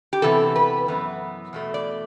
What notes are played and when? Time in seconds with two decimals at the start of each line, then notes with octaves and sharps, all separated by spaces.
0.13 G4
0.22 C3 E3 B3 A4
0.56 B4
0.88 F#2 E3 B3
1.53 E2 B2 A3
1.74 D5